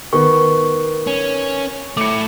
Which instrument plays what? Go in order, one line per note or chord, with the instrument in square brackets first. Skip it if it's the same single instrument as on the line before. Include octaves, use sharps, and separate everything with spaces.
[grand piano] D#3 B3 [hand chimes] C#6
[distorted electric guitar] C#4
[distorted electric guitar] A3 E4 [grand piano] D6 C#7